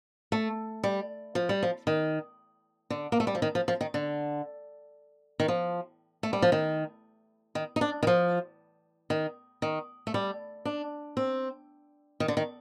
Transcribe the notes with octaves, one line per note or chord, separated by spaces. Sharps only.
A3
G3
F3
G3
F3
D#3
D3
A#3
A3
G3
F3
D#3
F3
F3
D#3
D3
D#3
F3
A3
G3
F3
D#3
D#3
D#4
D4
D#3
F3
D#3
D#3
A3
G3
D4
C4
D#3
D3
D#3